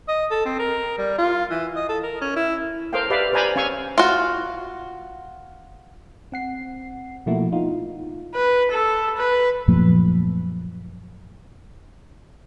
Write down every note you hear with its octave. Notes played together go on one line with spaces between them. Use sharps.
D#5
A4
C4
A#4
G3
F4
E3
D#5
A4
A#4
C#4
E4
A4 A#4 C5 C#5 F5 G5
G4 B4 D5 E5 F5 G5
B4 C5 D5 G#5 A#5 B5
C#4 F5 G#5 C#6 E6
F4 F#4
C4 F#5 C7
B2 F3 A3 A#3 E4 F#4
D#4 F4
B4
A4
B4
F#2 A#2 F3 A3